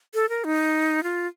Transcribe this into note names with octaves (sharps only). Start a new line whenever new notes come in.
A4
A#4
D#4
F4